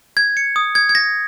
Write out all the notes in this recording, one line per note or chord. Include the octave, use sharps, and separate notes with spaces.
G#6
C#7
D#6
G#6
G#6
A#6